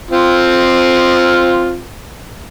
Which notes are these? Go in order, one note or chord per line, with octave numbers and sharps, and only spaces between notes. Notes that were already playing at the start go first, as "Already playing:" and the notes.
C4 F4